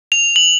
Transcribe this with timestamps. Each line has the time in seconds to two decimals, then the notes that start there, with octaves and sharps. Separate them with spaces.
0.12 F7
0.36 F#7